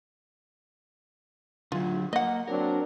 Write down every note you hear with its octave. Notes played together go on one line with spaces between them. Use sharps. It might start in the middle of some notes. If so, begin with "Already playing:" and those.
D3 F#3 F4
A#3 D#5 F#5
F#3 C4 D4 A#4